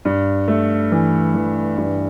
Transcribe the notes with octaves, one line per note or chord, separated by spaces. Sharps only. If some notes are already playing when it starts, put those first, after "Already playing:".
G2
A3
E3
E3
G2